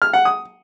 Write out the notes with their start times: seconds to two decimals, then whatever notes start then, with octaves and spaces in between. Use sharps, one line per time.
0.02 F6
0.13 F#5
0.25 D#6